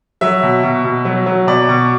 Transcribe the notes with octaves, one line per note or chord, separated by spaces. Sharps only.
F#3 E5
B2
B2
B2
F#3
F#3
B2 D5
B2